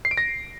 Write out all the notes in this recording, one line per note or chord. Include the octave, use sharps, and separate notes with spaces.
C7
D7
A#6